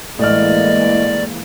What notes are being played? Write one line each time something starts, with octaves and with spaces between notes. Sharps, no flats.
A2 E3 G#3 A#3 D5 D#5 F6